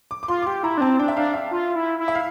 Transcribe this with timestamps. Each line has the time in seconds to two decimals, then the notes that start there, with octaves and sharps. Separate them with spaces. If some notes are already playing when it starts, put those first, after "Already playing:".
0.11 D6
0.23 D6
0.28 F4 C6
0.42 D6
0.46 G4 C6
0.63 E4 A#5
0.77 D4
0.81 C4 A5
0.99 D4 G5
1.08 E5
1.17 D4 F5
1.34 E5
1.51 F4
1.76 E4
1.99 E4
2.08 E5
2.15 F5